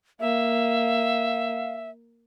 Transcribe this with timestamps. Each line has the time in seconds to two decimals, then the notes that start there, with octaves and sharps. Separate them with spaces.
0.20 A#3 E5 F5